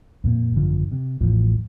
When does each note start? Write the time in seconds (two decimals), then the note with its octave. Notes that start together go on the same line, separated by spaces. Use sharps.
0.24 F2 A#2 A#3
0.54 G#1 F#2 D3 F3
0.92 C3
1.21 A1 E2 A2 F3